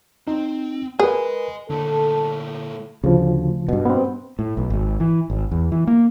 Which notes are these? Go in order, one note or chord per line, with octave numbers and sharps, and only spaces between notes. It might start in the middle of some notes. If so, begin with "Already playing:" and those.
C4 D#4
G#4 A#4 B4 D#5 G#5
A#2 D3 A3 A4
D2 C#3 F3
G2 B2
B3 C4
A2
B1
G#1
E3
G#1
E2
E3
A#3